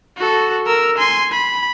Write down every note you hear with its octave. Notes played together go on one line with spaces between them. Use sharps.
F#4 A4
A#4 E6
G#5 C6
B5